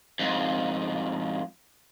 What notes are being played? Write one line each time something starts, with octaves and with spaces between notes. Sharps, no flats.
F2 G#2